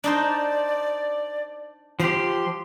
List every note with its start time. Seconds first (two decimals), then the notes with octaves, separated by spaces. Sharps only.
0.04 D4 D#4 C5 D5
2.00 F3 G4 C6